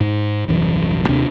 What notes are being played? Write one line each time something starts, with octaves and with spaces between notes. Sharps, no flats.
G#2
D#1 C2 F#2 E3
D#2 C3 C4 D4